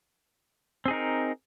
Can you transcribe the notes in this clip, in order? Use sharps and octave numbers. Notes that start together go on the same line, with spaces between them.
C4 D#4 G#4 A#4